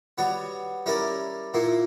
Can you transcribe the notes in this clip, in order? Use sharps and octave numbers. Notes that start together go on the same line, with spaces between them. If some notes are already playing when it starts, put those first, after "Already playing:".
G3 B3 F#4 C#5
G3 C#4 E4 A#4 D5
A#2 A#3 E4